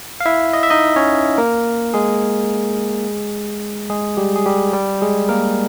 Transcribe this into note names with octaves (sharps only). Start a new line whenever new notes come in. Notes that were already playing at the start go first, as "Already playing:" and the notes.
F5
E4 E5
D#5
E5
D#4 D#5
C#4 C#5
A#3 A#4
G#3 G#4
G#3 G#4
G3 G4
G#4
G3 G4
G3 G4
G#3 G#4
A#3 A#4